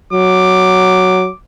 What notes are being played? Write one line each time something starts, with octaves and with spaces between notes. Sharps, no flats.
F#3 D6